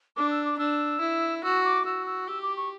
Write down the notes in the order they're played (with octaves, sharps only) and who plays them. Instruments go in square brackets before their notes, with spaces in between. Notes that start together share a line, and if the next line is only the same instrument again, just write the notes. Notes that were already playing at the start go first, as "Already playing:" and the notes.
[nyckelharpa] D4 [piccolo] D6
[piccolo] E6
D6
[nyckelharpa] D4 [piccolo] E6
[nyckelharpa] E4
[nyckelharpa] F#4 [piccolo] E6
[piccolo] D6
[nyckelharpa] F#4 [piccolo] E6
[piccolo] E6
[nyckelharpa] G4 [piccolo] E6
[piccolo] D6
C#6